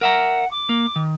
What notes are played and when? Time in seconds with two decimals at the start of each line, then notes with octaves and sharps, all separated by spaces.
0.01 A#4 E5 F#5 A#5
0.51 D6
0.69 A#3
0.96 D#3